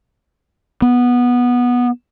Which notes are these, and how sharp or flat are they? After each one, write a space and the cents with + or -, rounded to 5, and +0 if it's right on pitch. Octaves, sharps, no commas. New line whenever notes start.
B3 -10